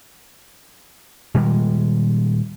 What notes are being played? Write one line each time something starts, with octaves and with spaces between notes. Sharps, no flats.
A#2 D#3 G3 G#3